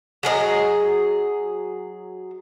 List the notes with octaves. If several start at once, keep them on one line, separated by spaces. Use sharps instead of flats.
F#3 G#4 A#4 D#5